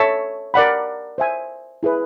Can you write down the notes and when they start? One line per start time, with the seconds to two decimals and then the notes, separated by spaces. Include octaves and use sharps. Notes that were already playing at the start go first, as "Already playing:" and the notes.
Already playing: A4 C#5 E5 A5
0.54 A#4 D5 F#5 B5
1.18 C5 E5 G#5
1.83 E4 G#4 B4